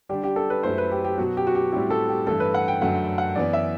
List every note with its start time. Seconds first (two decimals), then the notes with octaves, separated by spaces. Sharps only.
0.09 D3 G3 D4 G4
0.24 G4
0.36 A4
0.50 B4
0.63 F#2 F#3 A3 E4 C5
0.78 B4
0.92 G4
1.04 G4
1.18 B2 F#3 B3 F#4
1.37 G4
1.47 F#4
1.55 G4
1.72 A2 G3 C4 E4 G4
1.90 A4
2.09 G4
2.27 G2 E3 A3 A4
2.40 B4
2.54 F#5
2.68 G5
2.81 F#2 D3 F#3 A3 F#5
3.18 F#5
3.35 F#2 E3 B3 D5
3.53 E5